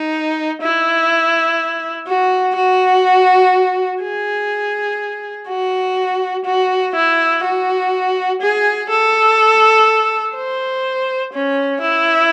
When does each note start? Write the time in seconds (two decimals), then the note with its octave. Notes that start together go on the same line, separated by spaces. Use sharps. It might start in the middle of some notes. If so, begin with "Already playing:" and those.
Already playing: D#4
0.62 E4
2.07 F#4
2.56 F#4
4.03 G#4
5.48 F#4
6.45 F#4
6.95 E4
7.44 F#4
8.41 G#4
8.90 A4
10.36 C5
11.33 C#4
11.81 E4